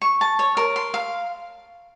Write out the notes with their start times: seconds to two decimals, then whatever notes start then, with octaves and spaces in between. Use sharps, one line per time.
0.02 C#6
0.21 A5
0.39 C#5
0.57 A#4
0.76 C6
0.94 F5